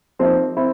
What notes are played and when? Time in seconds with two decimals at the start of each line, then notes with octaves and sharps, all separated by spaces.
0.19 F3 A#3 C4 D#4 C5
0.57 C4 E4